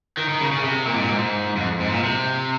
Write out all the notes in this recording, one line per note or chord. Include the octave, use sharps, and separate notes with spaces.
D#3
D#3
C#3
C#3
C3
A#2
G#2
A#2
G#2
F2
G#2
A#2
C3